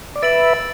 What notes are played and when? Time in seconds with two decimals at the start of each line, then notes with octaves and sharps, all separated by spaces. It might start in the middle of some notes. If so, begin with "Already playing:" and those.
0.16 D5
0.22 B4 E5 A6 D7 F#7